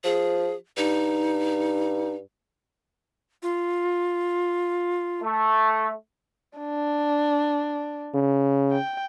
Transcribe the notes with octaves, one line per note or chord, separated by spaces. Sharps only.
F3 G#4
G2 D#4
F4
A3
D4
C#3
G5